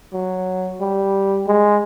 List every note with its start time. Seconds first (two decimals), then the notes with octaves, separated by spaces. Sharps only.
0.13 F#3
0.80 G3
1.47 G#3